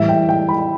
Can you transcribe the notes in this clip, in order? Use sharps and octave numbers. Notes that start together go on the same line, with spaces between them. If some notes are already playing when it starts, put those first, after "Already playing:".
Already playing: A2 E3 G3 E5
G5
G5
B5